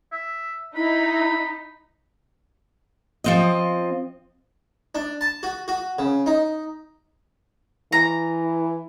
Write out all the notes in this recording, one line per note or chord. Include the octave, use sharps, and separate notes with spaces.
E5
D#4 E4 B5
F3 C4 D#5
D4
A5
F#4
F#4
C#3
D#4
E3 A#5